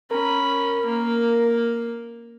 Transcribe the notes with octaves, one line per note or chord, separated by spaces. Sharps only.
C#4 A#4 B5
A#3